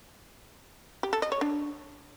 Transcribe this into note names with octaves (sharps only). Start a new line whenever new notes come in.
G4
A4
D#5
C#5
D4